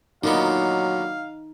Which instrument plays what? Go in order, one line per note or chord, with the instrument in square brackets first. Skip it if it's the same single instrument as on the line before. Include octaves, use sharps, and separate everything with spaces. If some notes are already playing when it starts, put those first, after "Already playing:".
[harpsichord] A#2 D3 B3 [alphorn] F#3 [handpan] D#4 [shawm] F5